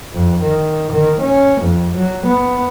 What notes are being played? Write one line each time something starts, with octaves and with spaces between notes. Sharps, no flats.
F2
D#3
D#3
C#4
F2
F#3
B3